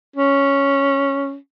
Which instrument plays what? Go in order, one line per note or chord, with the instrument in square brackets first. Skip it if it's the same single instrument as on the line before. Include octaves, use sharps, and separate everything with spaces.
[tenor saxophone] C#4